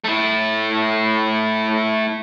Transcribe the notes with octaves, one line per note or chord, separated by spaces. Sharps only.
A3 E4